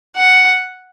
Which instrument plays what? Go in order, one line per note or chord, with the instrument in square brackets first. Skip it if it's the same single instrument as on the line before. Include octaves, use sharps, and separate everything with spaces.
[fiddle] F#5